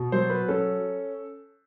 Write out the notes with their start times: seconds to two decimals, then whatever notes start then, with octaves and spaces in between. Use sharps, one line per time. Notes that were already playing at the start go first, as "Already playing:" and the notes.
Already playing: B2
0.12 F#3 C5
0.30 B4
0.48 C#4 A4